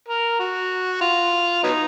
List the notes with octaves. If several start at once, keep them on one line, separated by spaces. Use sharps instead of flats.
A#4
F#4
F4
F#3 B3 D#4